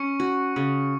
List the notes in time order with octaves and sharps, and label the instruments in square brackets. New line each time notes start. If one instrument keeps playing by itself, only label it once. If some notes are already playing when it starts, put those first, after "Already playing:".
Already playing: [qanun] C#4 [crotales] C#6 C#7
[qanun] F#4
C#3